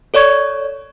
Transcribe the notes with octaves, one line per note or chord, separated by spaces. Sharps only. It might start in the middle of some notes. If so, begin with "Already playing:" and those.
A4 C#5 D5 C#6 G#6